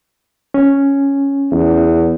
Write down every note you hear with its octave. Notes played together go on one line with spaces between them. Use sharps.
C#4
E2